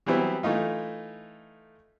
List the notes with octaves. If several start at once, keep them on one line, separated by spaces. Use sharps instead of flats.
E3 F#3 G3 B3 C4 E4
E3 A3 D#4 F4